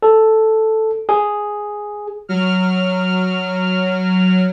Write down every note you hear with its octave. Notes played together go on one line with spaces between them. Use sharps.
A4
G#4
F#3 F6